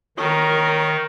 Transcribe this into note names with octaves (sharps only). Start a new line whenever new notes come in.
D#3 A#4 C#5 D#6